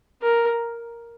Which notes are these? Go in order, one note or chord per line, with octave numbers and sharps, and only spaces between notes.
A#4